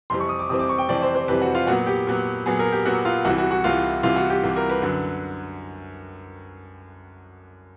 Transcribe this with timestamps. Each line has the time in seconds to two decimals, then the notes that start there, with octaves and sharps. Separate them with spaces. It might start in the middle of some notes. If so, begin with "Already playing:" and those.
0.10 F2 C3 E3 G3 C4 C6
0.20 C#6
0.29 D#6
0.39 D6
0.49 F2 C3 E3 G3 C4 D#6
0.59 D6
0.69 C#6
0.78 G5
0.89 F2 C3 E3 G3 C4 D5
1.02 C5
1.15 C5
1.28 F2 C3 E3 G3 C4 B4
1.42 F#4
1.55 F4
1.67 A#2 F#3 B3 F#4
1.87 G4
2.07 A#2 F#3 B3
2.46 A#2 F#3 B3 G#4
2.59 A#4
2.72 G4
2.85 A#2 F#3 B3 F#4
3.05 F4
3.25 C2 C3 E3 F#4
3.38 F#4
3.51 F#4
3.64 C2 C3 E3 F4
4.03 C2 C3 E3 F4
4.16 F#4
4.30 G4
4.43 C2 C3 E3
4.56 A#4
4.70 B4
4.82 F#2 D3 F#3